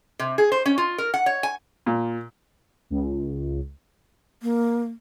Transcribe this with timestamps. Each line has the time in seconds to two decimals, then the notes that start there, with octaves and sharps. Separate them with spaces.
0.19 C3
0.38 G#4
0.52 C5
0.66 C#4
0.78 F4
0.98 A#4
1.14 F#5
1.26 C#5
1.43 G#5
1.86 A#2
2.90 C#2
4.42 A#3